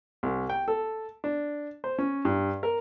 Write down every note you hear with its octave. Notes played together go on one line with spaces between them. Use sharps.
C2
G5
A4
D4
C5
C#4
G2
A#4